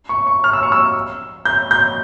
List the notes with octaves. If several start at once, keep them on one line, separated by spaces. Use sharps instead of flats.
C#6
C#6
F6
E6
C#6
E6
G6
G6